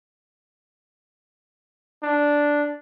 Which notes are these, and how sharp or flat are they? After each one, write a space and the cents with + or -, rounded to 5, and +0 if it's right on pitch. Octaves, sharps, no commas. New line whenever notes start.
D4 -5